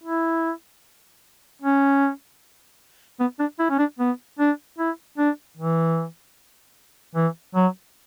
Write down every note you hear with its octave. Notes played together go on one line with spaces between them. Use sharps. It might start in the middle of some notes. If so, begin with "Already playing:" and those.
E4
C#4
B3
D4
E4
C#4
D4
B3
D4
E4
D4
E3
E3
F#3